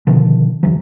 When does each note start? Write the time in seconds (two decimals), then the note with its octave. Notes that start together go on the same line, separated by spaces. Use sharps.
0.07 B2 D3 D#3 F3
0.63 E1 D2 E3 F#3